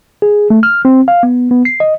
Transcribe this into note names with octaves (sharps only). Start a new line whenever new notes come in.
G#4
A3
F6
C4
F5
B3
B3
C7
D#5